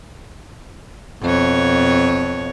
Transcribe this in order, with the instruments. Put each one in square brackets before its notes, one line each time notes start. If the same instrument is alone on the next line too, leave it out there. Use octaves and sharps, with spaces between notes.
[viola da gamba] F2 B2 C#5